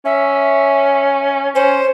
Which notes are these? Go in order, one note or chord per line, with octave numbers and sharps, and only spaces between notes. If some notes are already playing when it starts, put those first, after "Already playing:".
C#4 E5
C#4 C5